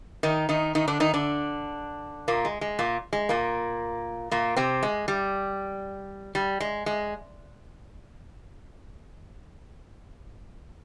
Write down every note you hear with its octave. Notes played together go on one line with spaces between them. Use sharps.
D#3 D#4
D#3 D#4
D#3 D#4
D3 D4
D#3 D#4
D3 D4
A#2 A#3
G#3
G#3
A#2 A#3
G#3
A#2 A#3
A#2 A#3
C3 C4
G#3
G3
G3
G#3
G#3